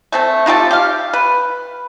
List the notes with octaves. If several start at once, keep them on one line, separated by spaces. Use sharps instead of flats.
A3 C4 A4
D#4 F4 G4 A4
G4 F5
B4